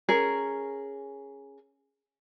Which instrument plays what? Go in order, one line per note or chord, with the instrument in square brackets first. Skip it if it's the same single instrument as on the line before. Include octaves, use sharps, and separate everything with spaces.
[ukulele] C#4 G#4 A#4